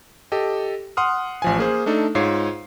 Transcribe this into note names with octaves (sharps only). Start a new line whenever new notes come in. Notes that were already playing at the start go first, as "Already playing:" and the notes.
G4 A4 D#5
F#5 C6 D#6 F6
A1 F3 G#5
A#3 G#4 C5
A3 D4 D#4 A4
G#2 F4 C#5 C7